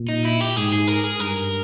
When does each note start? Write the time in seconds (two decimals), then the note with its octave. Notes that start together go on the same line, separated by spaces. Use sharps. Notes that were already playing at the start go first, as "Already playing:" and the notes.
Already playing: A#2
0.09 D#4
0.25 E4
0.41 G4
0.56 G#2 G#4
0.73 G#4
0.87 A#4
1.04 G#4
1.19 G2 A#4